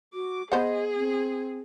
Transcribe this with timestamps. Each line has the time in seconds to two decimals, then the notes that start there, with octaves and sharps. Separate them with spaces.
0.14 F#4 D6
0.52 B3 G#4 C5 D#5 F#5
0.96 C4